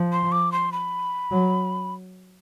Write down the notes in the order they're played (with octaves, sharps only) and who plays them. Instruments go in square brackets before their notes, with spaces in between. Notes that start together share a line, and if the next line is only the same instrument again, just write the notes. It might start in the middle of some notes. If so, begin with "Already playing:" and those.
Already playing: [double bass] F3
[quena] C6
D6
C6
B5
[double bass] F#3